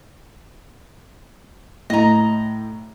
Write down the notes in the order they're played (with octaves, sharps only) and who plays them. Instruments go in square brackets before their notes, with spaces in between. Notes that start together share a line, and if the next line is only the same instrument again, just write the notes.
[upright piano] A2 [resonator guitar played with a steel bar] D#5 A#5